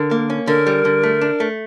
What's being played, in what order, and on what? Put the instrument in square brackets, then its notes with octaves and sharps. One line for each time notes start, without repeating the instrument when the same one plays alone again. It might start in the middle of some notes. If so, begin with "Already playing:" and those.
Already playing: [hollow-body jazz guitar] D3 [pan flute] A#4
[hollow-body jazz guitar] A#3
C#4
[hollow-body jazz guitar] D3 [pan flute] A#4
[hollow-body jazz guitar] G3
D3
A3
D4
A3